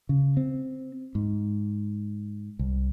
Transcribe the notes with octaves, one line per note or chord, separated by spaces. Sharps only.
C#3
C4
G#2
C2